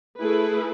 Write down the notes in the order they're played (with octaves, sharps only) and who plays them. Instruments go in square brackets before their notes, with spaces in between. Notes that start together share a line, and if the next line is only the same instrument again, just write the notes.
[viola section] A3 E4 G#4 B4